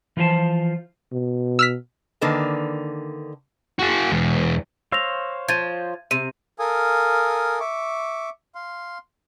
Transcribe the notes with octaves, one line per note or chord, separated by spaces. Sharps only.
E3 F3 F4 C5 A5
B2
E6 F6 B6
D3 D#3 A#3 B4 A5
F#4 G#4
E2 G#3
C5 C#5 F5 E6 A#6 F7
F3 G#6 A6 D#7
C3 D#7
A4 A#4 F5 G#5 D#6
E5 C#6 D6
F5 C6